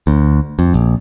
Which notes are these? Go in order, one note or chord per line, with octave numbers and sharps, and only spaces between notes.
D2
F2
A#1